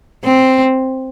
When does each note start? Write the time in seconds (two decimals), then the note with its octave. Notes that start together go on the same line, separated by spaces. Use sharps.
0.24 C4